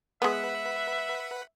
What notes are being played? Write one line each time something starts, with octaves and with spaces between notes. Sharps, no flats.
G#3 B3 B4 E5 F#5 B5